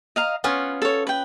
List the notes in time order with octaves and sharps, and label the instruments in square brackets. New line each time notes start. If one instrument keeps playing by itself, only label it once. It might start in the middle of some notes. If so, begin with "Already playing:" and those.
[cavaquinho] D#5 F5 A#5
[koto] B3 C#4 F4 [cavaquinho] B4
[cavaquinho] A4 C#5
B4 G5